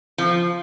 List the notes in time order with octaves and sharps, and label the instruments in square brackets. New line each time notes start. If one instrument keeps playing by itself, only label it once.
[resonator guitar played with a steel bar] F3